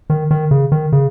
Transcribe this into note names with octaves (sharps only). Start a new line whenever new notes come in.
D#3
D#3
C#3
D#3
C#3